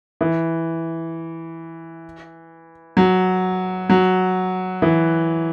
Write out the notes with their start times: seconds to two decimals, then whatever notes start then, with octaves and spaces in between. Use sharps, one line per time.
0.21 E3
2.97 F#3
3.90 F#3
4.82 E3